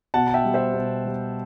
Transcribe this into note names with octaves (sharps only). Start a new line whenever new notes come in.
B2 F#5 A5
A5
E5 G5
G3
C5 E5
B2
G3